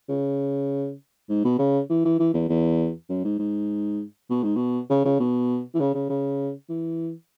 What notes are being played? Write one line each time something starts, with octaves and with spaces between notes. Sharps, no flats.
C#3
G#2
B2
C#3
E3
E3
E3
E2
E2
F#2
G#2
G#2
B2
G#2
B2
C#3
C#3
B2
E3
C#3
C#3
C#3
E3